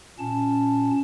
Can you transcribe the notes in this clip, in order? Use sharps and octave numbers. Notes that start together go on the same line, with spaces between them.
A#2 C#4 A5